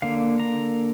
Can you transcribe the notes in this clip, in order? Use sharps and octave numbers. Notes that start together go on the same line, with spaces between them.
D3 A#3 F5
A#5